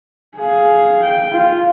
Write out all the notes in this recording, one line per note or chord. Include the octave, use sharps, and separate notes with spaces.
G#4 F5
G5
F4